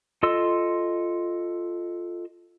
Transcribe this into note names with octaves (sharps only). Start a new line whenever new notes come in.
F4 A4 D#5 C6 E6